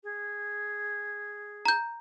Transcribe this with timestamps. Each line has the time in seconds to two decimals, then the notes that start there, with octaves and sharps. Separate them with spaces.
0.04 G#4
1.65 A#5 G6